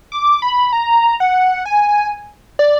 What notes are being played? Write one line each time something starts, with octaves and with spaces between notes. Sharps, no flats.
D6
B5
A#5
F#5
G#5
D5